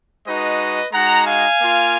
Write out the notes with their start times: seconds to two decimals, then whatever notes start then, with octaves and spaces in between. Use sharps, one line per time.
0.27 G#3 D#4 F#4 B4 D#5
0.93 G#3 D#4 F#4 F#5 A#5
1.26 F5 G#5
1.59 A#3 F4